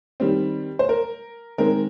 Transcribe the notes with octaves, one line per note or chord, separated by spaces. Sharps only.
D#3 G3 C4
C5
A#4
D#3 G#3 C4 A#4